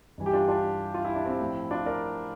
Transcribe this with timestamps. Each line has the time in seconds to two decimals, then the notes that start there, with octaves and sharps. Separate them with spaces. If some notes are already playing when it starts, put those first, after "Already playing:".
0.18 G2 E3 G3
0.26 G4
0.33 D4 F4
0.48 D4 F4
0.94 F4
1.05 E4
1.15 D4
1.25 C4 E4
1.40 A2 F3
1.71 D4 F4
1.86 A#4 D5